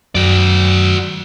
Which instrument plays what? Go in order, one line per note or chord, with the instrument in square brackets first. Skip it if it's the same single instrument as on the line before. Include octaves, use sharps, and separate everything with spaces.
[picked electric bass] F#2 [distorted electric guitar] F#4 D5